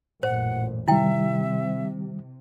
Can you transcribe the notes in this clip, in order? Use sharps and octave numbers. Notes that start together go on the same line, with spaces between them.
A1 F#2 A#2 C5 F#5
C3 D#3 G3 E4 E5 G5